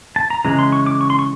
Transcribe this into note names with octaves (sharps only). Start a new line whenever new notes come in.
A5
A#5
C#3 E3 G#3 A#5
C6
C#6
D6
C#6
C6
C#6